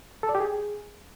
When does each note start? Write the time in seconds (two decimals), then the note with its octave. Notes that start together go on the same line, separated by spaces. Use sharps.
0.23 A4
0.29 D5
0.35 G4
0.40 G#4